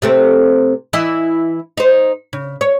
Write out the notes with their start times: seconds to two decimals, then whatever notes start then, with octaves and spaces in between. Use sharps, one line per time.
0.02 C3 A3 C4
0.93 E3 E4 D#5
1.77 D#4 C5
2.33 C#3
2.61 C#5